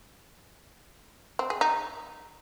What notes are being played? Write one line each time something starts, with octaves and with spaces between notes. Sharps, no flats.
C4
G#4
D#4